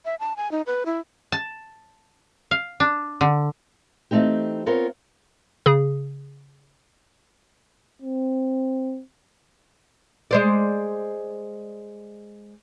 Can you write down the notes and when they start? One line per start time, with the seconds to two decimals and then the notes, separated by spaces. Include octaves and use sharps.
0.05 E5
0.20 A5
0.37 G#5
0.52 D#4
0.66 B4
0.86 E4
1.32 A5
2.51 F5
2.80 D4
3.21 D3
4.11 E3 A3 A#3 C4 D#4 G4
4.66 B3 C4 F4 A#4 C#5
5.66 C#3 G#4
8.02 C4
10.31 G#3 C5 D5